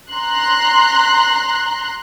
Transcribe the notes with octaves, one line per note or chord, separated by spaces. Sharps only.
A#5 C6 F#6